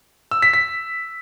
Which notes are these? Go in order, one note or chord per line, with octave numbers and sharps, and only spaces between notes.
E6
B6
B6